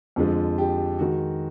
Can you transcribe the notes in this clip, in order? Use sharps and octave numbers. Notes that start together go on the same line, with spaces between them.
F2 D3 F3 G#3
G4
D#3 G#3 F#4